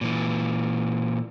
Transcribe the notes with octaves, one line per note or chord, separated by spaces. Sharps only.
A#2 E3